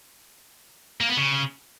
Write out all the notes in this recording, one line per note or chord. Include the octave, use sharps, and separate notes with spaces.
A#3
B3
C#3